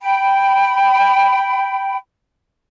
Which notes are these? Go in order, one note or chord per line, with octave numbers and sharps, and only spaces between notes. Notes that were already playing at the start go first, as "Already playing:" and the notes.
G5 B5